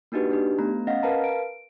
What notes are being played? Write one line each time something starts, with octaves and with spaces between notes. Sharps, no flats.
A#3 D4 D#4 F#4 G4 B4
D4 D#4 G4
A3 B3 A#5
C#4 D#5 F5 F#5 A#6
A#4 B4 F5 A5 A#5
D7